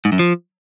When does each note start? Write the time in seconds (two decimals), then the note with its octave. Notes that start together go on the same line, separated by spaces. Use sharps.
0.05 G#2
0.12 F#2
0.19 F3